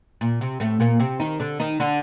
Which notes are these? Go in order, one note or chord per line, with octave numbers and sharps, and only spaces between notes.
A#2
C3
A2 A3
A#2 A#3
C3 C4
D#3 D#4
D3 D4
D#3 D#4
D3 D4